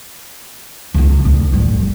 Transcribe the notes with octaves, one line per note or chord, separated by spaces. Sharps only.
C#2 D#4
D2
A1 G2
F#1